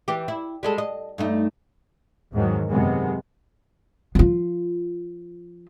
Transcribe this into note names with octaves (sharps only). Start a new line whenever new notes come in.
E3 G4
E4
G3 G#3 A4
D#5
G2 A3 D#4
E2 G#2 D#3 F#3
F#2 C3 D#3 G#3 B3
F3 F4